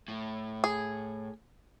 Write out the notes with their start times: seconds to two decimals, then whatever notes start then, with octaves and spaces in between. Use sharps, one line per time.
0.08 A2
0.64 G#4